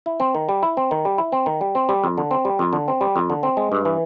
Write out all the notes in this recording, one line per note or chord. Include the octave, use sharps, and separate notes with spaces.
E4
C4
D#3
G3
E4
C4
D#3
G3
E4
C4
D#3
G3
C4
G3
F2
D3
C4
G3
F2
D3
C4
G3
F2
D3
C4
G#3
G2
E3